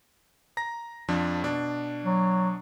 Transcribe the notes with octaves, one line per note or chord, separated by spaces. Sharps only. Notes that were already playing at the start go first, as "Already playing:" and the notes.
A#5 A#6
F2 F3 D4
B2 D4
F#3